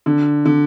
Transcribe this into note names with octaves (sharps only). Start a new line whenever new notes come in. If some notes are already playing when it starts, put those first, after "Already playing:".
D3
D3